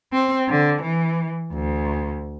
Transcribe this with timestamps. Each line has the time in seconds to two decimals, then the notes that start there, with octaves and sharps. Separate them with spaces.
0.13 C4
0.49 D3
0.83 E3
1.53 D2